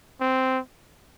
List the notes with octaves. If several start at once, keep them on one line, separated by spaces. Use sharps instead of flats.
C4